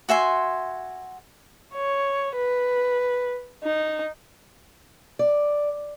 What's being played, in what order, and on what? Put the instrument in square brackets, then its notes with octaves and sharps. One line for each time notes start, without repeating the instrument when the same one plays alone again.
[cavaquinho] F#4 E5 G#5 C6
[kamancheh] C#5
B4
D#4
[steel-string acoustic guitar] D5